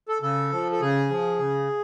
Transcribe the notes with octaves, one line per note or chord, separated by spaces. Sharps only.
A4
C#3 A4
F3
A4
C#3 G#4
F3
C#3